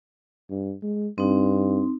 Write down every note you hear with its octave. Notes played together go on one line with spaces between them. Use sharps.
G2
G#3
G2 C4 D#4